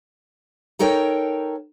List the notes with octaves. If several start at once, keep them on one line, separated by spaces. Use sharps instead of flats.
D#4 A4 A#4 C#5 G5